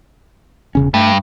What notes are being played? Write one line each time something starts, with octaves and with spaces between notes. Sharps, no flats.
E1 C#3 C#4
G2 A3